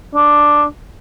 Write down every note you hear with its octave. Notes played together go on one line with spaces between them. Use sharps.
D4